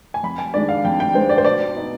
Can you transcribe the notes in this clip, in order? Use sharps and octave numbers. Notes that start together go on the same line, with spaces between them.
G#5
F2 B5
G#5
D#3 G#3 D4 D5
F5
F2 G5
G5
D#3 G#3 D4 C5
D5
C5
B2 D5
B3 D#4